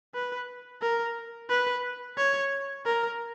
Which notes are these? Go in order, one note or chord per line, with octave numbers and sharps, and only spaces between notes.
B4
A#4
B4
C#5
A#4